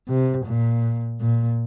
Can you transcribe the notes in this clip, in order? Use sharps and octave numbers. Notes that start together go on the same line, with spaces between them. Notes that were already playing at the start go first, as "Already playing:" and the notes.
C3
A#2
A#2